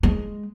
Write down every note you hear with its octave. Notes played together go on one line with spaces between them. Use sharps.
G#3